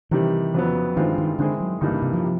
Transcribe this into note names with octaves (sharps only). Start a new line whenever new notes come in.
C3 D#3 E3 G3
F2 C#3 F#3 B3
G2 D#3 E3 G#3 C4 F4
D#3
D3 D#3 G#3 C4 E4 G#4
F#3
G2 D3 E3 G3 A#3 D#4
C#3
C3
F3
C3